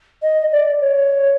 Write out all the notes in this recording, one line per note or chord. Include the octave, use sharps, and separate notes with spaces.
D#5
D5
C#5